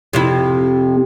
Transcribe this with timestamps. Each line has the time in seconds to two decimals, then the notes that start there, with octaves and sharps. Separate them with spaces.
0.13 F2 C3 E4